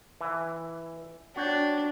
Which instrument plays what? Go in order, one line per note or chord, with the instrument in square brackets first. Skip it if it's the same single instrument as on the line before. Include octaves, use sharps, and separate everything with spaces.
[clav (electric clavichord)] E3
[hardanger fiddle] D4 [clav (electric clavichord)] F#4 C#5 G5